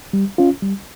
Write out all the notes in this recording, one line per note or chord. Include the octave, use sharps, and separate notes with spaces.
G3
C#4 F4
G3